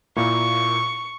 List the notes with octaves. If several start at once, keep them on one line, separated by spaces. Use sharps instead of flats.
A#2 A#3 E4 C#6